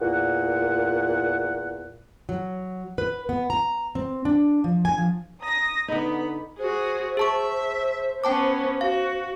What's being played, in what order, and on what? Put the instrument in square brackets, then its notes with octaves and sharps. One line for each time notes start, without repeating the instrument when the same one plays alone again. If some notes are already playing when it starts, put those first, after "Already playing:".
[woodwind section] E2 A#2 F#5
[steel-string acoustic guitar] F#3
B4
B3
A#5
C4
D4
F3
G#5
F3
[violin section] A#5 D#6 A#6
[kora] D3 D#4 [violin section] B3 B5
[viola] F#4 G#4 [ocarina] C5
[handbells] G#4 A5 C#6 [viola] E5
[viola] B3 C#4 [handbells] G5 A5 D6
[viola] F#4 [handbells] F5